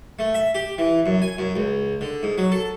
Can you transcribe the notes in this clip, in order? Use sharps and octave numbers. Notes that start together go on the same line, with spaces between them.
A3
E5
G4
E3
F#2
G#5
F#2
C#2
D3
G#2
F#3
A4